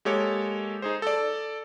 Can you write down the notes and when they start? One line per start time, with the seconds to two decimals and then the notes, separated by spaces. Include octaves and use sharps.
0.05 G#3 A#3 G4 A4 C#5
0.82 D#4 G#4 C5
1.02 A4 D5